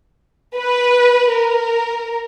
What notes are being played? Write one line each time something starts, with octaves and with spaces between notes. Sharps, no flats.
B4
A#4